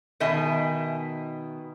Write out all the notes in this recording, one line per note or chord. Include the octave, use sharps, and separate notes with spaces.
B2 D#3 D#5 E5 G#5